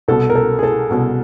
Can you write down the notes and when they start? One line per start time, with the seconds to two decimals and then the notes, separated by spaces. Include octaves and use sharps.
0.08 C2 B2 A4
0.30 A#4
0.35 A4
0.59 G#4
0.63 A4
0.90 C2 B2